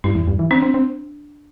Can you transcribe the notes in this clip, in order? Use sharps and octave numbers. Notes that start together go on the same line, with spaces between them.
G2 E4
E2
G2
E3
C4 D4
C4
C4